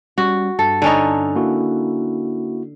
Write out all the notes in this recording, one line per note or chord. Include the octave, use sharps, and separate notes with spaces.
G3 C#4 F#4
G2 A4
D3 C#4 D#4
A#3 E4 F#4